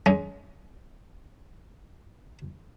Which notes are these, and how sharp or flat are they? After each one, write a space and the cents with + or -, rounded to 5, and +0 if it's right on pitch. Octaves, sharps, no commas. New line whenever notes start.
G#3 +15 C#4 +30